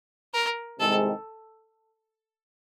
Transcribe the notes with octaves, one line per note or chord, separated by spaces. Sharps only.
A#4
C2 C3 D#3 G#3 C4 A4